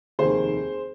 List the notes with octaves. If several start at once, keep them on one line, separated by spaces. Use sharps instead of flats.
F1 D#2 D#3 G#4 C5